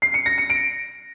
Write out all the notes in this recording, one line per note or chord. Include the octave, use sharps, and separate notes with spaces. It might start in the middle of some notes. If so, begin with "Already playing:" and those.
C7
C#7
A#6
C#7
D7